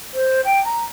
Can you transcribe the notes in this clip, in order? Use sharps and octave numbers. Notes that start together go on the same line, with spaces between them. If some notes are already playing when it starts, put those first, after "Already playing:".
C5
G5
A#5